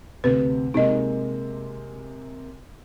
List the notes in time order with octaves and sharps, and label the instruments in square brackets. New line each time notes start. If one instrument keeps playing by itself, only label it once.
[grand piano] D2 C3 C4 [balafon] B4
[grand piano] C3 G#3 A#3 [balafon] D#4 D#5